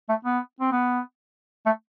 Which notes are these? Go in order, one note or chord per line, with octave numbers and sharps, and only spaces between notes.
A3
B3
C4
B3
A3